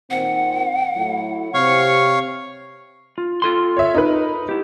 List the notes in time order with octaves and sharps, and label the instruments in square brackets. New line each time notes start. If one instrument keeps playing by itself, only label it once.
[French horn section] A#2 D#3 C4 [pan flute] F#5
[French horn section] A2 F#3 E4
[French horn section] C3 [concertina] C#5 F5 C#6
[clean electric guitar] F4
F4 A4 C6
[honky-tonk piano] C#5 E5
D#4 A#4 B4
[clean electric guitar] E4 G4